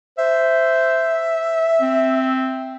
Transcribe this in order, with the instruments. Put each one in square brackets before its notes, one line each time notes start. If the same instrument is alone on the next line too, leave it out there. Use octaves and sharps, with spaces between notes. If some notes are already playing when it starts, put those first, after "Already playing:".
[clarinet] C5 [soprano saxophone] E5
[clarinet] C4